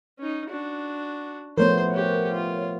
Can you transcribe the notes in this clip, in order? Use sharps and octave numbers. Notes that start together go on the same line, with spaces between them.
C#4 D#4
D4 F#4
F3 A3 B3 A#4 C5 C#5
F#4 G4
F4